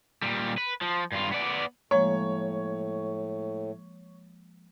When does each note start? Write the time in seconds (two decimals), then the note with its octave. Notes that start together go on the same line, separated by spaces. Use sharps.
0.22 A#2 G3
0.57 B4
0.81 F3
1.12 G2 F4
1.32 B3 D5
1.91 A2 F3 G#3 A#3 C#5